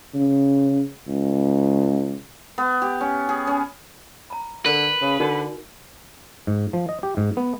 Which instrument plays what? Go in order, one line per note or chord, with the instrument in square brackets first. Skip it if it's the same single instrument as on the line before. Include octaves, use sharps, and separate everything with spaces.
[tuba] C#3
C#2
[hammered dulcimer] B3
G4
C#4
G#4
C#4
[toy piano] A#5 B5
[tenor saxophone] D3 [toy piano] A#4 [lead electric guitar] B4
[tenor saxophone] C#3
[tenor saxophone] D3 [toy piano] D#4 F#4 A#4
[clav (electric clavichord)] G#2
F3
D#5
G4
G#2
B3